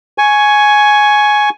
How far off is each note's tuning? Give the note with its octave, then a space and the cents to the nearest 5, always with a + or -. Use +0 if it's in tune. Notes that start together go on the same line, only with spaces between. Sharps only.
G#5 +10 C#6 +0